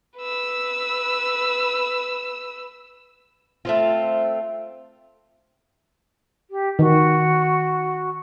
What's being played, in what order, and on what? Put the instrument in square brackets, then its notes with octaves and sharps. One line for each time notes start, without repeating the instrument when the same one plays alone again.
[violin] B4 E6
[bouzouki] A3 C4 F4
[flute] G4
[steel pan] D#3 [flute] F#4